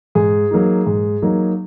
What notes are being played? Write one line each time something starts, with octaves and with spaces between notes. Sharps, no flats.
G#2 G#4
F#3 A#3 D#4
G#2
F#3 A#3 D#4